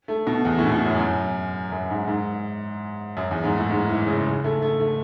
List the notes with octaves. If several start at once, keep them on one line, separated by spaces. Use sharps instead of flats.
A3
B2
E2
A2
B2
A2
F#2
F#2
F#2
G#2
G#2
F#2
E2
G#2
A2
G#2
E3
C#3
C#3
A3
A3
A3